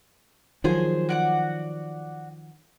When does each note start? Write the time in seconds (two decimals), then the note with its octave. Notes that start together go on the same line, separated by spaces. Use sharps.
0.64 D#3 F3 F#3 G#4 C5 G#5
1.09 F#4 D5 F#5